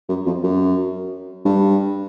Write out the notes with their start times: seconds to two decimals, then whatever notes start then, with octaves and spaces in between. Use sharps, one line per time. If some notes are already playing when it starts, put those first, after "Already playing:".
0.09 F#2
0.26 F2
0.44 F#2
1.45 G2